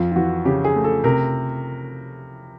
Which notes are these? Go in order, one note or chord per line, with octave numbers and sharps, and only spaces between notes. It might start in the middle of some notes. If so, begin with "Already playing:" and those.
Already playing: F2 F4
F4
E3 F#4
C#3 G4
G#4
A3
A4
C3 A#4